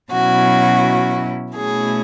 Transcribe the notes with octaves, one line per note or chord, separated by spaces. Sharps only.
B2 F#3 C#4 E4 F#4
B2 A3 C#4 E4 G#4